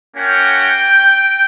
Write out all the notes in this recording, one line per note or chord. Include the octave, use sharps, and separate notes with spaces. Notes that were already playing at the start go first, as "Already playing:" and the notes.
A#3 C#4 F#4 G5